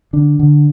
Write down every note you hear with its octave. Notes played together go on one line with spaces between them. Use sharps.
D3 D4
D3